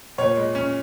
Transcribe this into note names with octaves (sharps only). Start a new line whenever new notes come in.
A#2 C#5
G#3
C#4